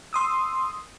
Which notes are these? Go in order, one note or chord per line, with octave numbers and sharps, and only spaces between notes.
C6 D#6 E6